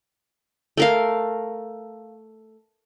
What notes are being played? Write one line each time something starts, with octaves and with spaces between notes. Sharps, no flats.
A3 A#4 F5